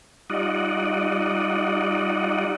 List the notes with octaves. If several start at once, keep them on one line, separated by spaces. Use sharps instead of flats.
G3 D#4 F4 D5 D#5 F#5